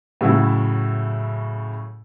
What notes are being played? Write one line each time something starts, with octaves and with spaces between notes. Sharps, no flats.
A2 C#3 F#3 A3 E4 F#4